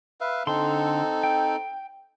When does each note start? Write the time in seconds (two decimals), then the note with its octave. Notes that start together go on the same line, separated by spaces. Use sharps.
0.21 B4 E5 F5
0.47 D3 C4 D#4 A4 C6
1.23 G5